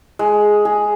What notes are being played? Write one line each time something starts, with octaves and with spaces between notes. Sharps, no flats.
G#3
G#4